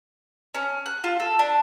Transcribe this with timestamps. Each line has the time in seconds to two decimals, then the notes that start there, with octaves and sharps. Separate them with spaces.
0.55 C#4
0.86 F#6
1.04 F4
1.20 A4
1.39 D4